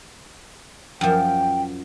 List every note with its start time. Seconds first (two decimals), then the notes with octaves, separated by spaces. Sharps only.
1.01 F#2 F3 G5